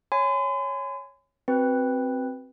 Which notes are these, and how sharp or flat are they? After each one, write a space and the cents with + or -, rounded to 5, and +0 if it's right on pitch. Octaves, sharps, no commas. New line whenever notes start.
C#5 +0 G#5 +0 C6 -45
C4 +0 F#4 +20 B4 +0